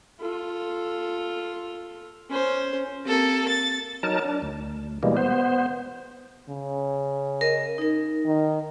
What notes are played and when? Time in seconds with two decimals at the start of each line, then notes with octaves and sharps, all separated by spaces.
0.20 F4 A4
2.29 C#4 C5
3.05 A#3 C4 G4 A4
3.49 A6
4.03 F#3 D#4 A#4 A5
4.25 D4
4.42 D2
5.03 B2 E3 G3 G#3 A#3
5.17 B3 C5
6.49 C#3
7.41 A#4 D#5
7.78 D#4 A#4
8.26 D#3